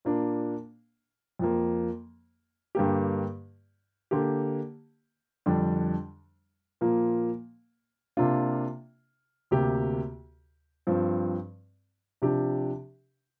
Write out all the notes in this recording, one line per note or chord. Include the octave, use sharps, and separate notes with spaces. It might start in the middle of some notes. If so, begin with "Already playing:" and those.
A#2 A#3 D4
F2 F3 A#3
G2 D3 A#3 G4
D3 A#3 G4
F2 D3 G3 D4
A#2 F3 A#3
C3 A#3 D4 F4
D2 C3 A#3 G4
G2 F3 C4
C3 F3 D4 G4